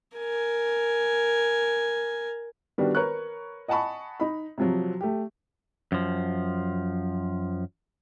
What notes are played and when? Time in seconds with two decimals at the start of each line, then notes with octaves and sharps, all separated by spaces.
0.18 A#4 G#5
2.78 D#3 G3 B3 D4 F#4
2.95 A#4 B4 C#5 A#5 C#6 F#6
3.68 D#5 F#5 G#5 A5 B5 C#6
4.20 D#4 B5
4.58 C3 F3 F#3
5.01 A3 G4
5.92 F#2 F3